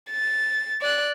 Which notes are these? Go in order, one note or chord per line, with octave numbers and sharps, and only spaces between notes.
A6
D5 F#6